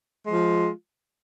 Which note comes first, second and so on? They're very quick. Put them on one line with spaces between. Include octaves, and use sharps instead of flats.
G#3 F3 F4